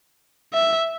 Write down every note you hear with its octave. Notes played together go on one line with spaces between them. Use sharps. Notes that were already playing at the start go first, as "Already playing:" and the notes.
E5